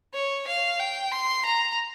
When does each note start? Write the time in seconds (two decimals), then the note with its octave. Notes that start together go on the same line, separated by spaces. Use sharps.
0.14 C#5
0.47 F5
0.80 G5
1.12 C6
1.45 A#5